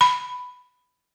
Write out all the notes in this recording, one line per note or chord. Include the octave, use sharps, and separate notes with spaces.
B5